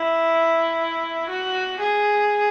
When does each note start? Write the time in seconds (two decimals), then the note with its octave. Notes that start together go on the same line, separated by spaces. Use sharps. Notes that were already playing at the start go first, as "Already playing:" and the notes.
Already playing: E4
1.29 F#4
1.80 G#4